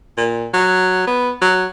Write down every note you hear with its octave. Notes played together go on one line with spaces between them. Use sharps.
A#2
F#3
B3
F#3